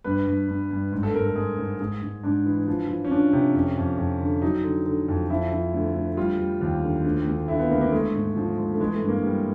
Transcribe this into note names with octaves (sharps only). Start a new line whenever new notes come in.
G2 B4
G2
G2
G2
G#2
A4
G#2 A#4
A4
G#3 G#4
G#2
G#2 G#4
G#2
G#2 D4
E3
F3
F3
C#4
F3 D4
C3
F2 C#4
F2
F2
D3
F#3 D#4
D3
D3
F2
F3 E4
F3
D2
D2
G3 F4
G3
D#2
D3
D2
D2
D3 E4
B3
D2 A#3
A#3
G#3 A3
G#2
F3
G#3
A3
E3 G#3
A3
G2
A#3
G3